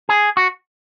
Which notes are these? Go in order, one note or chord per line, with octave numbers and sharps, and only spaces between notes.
G#4
F#4